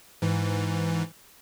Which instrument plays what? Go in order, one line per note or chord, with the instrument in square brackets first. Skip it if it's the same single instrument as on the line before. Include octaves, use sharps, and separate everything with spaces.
[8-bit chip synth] G#2 E3